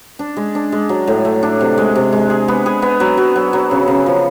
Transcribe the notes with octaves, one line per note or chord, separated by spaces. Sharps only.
D4
G#3
D4
G#3
F#3
A2
A3
D4
C3
G#3
C3
G#3
G#4
B3
G#4
B3
F#3
F#3
F#3
F#3
C#3
C#3
F3